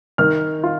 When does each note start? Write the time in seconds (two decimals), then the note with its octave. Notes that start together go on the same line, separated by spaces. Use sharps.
0.18 D#3 F6
0.64 F4